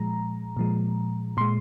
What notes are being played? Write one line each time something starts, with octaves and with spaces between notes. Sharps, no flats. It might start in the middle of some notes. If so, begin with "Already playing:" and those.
Already playing: A#2 F3 G#3 A#5
A#2 F3 G#3
A#2 G#3 C6